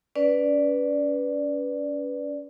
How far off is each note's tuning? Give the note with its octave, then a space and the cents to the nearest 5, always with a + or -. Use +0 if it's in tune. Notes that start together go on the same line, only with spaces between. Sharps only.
C#4 +35 B4 +0 D5 +0